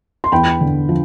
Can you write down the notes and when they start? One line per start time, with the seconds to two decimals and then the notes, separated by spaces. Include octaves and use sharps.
0.24 C6
0.32 E2 G5 B5
0.61 D3
0.89 F3